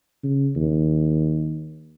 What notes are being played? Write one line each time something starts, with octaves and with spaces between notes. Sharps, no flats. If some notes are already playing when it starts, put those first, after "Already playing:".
C#3
D#2